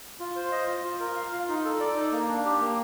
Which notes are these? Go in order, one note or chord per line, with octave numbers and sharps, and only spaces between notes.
F4
C5
D#5
F4
F4
A#4
F5
F4
D#4
A4
D5
D#4
A#3
D4
G4
A#3